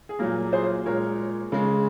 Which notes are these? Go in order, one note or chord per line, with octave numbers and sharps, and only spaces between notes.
G#4
A#2 F#3 A#3 A#4
G#4 C5
A#2 G#3 A#4 C#5
C#3 G#3